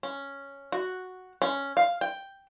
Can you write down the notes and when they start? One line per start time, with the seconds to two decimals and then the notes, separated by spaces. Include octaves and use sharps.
0.03 C#4
0.72 F#4
1.42 C#4
1.77 F5
2.01 G5